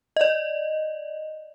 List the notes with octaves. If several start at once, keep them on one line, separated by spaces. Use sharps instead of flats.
D5 D#5